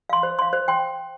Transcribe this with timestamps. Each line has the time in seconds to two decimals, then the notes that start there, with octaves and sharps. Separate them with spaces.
0.09 F5 C6
0.23 C5
0.39 F5 C6
0.53 C5
0.68 G5 C6